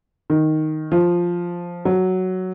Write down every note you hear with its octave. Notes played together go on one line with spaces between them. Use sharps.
D#3
F3
F#3